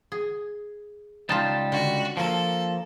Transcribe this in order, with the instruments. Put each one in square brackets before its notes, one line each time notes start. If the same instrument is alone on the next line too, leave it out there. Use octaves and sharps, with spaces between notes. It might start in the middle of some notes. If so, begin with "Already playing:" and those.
[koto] G#4
[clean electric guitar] C#2 G3 A5 [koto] D#4 F4
[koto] D3 [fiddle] F#4
[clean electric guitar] F3 A#3 [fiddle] A4